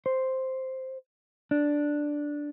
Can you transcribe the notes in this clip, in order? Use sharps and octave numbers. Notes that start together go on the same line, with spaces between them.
C5
D4